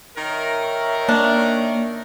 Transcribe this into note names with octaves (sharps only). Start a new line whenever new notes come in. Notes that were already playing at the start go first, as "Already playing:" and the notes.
D#3 D#4 A#4 C#5 E5
A#3 D4